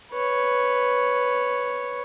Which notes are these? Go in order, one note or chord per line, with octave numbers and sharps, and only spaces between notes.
B4 C#5